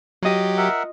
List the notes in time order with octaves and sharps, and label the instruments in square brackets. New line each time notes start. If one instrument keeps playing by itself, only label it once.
[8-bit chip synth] F#3 G4 [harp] F4 D#5
[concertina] A#4 E5 F#5